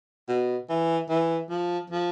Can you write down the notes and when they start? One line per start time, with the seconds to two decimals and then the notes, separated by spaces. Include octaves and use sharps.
0.28 B2
0.69 E3
1.09 E3
1.50 F3
1.90 F3